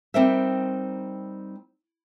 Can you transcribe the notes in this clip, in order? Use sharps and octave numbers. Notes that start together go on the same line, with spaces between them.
G3 C4 D#4 A#4 C5 E5